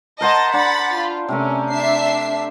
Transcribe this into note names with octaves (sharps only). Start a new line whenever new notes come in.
A#4 C5 D#5 F#5 A5 A6
D4 F#5 B5 A6
F4
C3 A3 C#4 A#4
D4 E5 C7